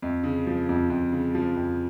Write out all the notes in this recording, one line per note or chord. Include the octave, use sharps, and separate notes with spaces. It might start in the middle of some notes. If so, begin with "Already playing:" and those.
F2
C#3
F3
F2
F2
C#3
F3
F2